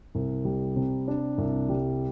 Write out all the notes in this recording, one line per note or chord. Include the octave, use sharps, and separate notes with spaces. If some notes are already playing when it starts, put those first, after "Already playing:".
C2
G3
C3
D4
C2
G3